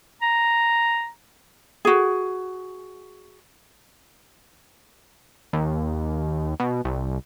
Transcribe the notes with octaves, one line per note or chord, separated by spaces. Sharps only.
A#5
F#4 G#4
D#2
B2
C2